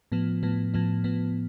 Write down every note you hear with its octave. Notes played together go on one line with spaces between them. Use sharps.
A2 F3 B3
A2 F3 B3
A2 F3 B3
A2 F3 B3